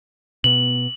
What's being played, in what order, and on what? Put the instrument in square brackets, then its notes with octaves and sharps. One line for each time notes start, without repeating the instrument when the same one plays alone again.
[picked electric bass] B2 B3 [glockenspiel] F#7